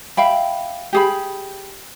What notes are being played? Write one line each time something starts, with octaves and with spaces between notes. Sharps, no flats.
E5 F5 G5 B5
G4 G#4 B5